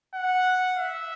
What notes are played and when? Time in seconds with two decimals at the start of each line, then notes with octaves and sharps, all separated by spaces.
0.15 F#5
0.78 E5